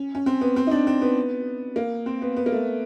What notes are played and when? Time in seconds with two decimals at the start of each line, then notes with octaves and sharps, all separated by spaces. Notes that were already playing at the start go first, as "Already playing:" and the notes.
Already playing: C#4
0.15 C#4
0.26 C4
0.41 B3
0.56 C4
0.67 D#4
0.71 D4
0.87 C4
1.02 B3
1.76 A#3
2.06 C4
2.22 B3
2.36 B3
2.46 A#3
2.52 A3